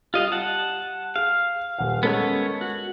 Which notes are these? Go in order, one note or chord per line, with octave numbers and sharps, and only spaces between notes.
G3 F4 D#5 F5
F#5 A5
G#4 F5
D#1 F#5
G#3 B3 C#4 A4 A#4 C#5
F#4